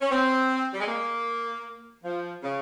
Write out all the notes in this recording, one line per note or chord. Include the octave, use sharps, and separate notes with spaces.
C#4
C4
G3
G#3
A#3
F3
C#3